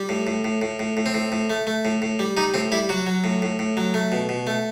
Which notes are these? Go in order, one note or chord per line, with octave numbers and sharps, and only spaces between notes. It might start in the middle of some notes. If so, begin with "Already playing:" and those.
Already playing: G3
A2
A2
A2
A2
A2
A2
C4
A2
A2
A3
A3
A2
A2
G3
G3 D#4
A2 C4
G3 E4
F#3 F#4
F#3
A2
A2
A2
F#3
A3
B2
B2
A3